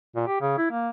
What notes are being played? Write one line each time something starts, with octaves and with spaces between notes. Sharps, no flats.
A#2
G4
C#3
E4
A#3